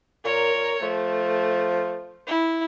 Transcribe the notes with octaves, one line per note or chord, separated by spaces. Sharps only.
A#2 A#4 C#5
A#2
F3 A3
E4